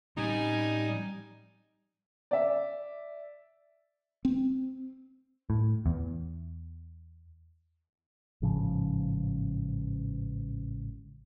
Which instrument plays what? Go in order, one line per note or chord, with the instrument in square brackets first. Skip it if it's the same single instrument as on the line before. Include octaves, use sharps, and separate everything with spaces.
[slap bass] A2 C4 C#4 [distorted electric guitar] G3 [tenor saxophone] D#4 [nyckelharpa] G#5
[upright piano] D5 E5
[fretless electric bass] C4
[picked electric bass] A2
E2
[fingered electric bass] A1 G#2 C#3 F3